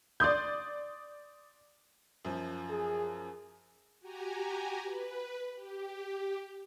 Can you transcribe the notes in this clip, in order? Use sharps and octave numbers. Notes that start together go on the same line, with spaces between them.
D5 C6 D#6 G6
F#2 F3
G#4
F#4 G4 G#5 A#5
B4
G4